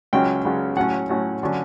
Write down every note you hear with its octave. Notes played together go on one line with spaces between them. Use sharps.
C#2 C#3 F#3 C#4 G5
C#2 C#3 F#3 C#4
A2 F#3 C#4 F#5
A2 F#3 C#4
D3 F#3 C#4